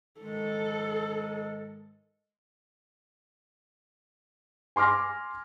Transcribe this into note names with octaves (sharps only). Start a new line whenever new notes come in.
G#2 D#3 G#3 A4
G#5 C6 D6 F6 A#6